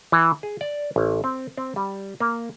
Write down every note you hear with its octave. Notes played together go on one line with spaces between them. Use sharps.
E3
G#4
D5
A1
C4
C4
G3
A#3